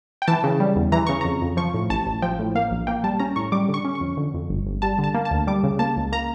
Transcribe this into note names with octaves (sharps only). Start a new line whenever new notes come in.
G5
E3 A5
C#3
G3
E2
E3 A#5
C#3 C#6
F2 A#5
F2
F3 C#6
A2
A1 A5
A1
F3 G5
A2
A#3 F5
A#1
A#3 G5
G3 A5
C#4 A#5
A2 C#6
G3 D6
D3
C#6
C#4
C#6
F2
D3
F2
G1
G1
G3 A5
D3
A5
A#3
A5
D2
G3 D6
C#3
A#3 A5
C#2
A#3 A#5